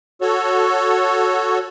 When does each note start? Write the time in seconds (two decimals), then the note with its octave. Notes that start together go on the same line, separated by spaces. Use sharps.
0.21 F#4 A4 C#5